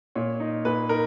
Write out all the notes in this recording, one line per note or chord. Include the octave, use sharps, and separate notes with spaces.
A#2 C#5
D#4
A#2 B4
D#4 A#4